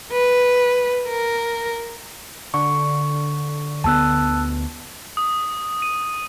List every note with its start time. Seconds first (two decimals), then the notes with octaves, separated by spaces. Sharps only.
0.12 B4
1.08 A#4
2.54 D3 C#6
3.84 D2 B3 A5 E6 F#6
5.17 D#6
5.82 D#7